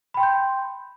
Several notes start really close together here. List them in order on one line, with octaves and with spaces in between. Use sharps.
B5 G5 C6 G6